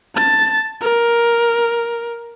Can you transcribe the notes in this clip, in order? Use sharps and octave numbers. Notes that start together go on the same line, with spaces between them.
A5 A6
A#4